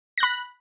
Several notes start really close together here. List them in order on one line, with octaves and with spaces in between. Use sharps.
A#6 F#6 B5